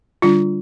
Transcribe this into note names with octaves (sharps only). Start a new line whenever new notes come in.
D3 G3 D4 F4